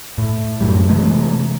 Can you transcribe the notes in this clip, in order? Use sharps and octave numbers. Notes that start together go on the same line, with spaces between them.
A2
F#2 A2 G3
C3 E3 G#3 A3